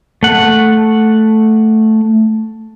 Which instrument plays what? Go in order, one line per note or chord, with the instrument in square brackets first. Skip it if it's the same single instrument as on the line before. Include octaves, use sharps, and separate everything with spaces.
[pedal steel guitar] A3 F#5